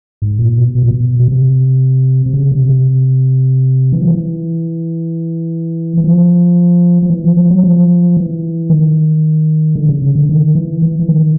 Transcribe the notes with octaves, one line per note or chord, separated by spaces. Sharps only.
G#2
A#2
B2
B2
A#2
B2
B2
C3
C3
C#3
C3
C3
E3
F3
E3
E3
F3
F3
E3
F3
F3
F#3
F3
E3
D#3
D3
C#3
C#3
D3
D#3
E3
E3
E3
D#3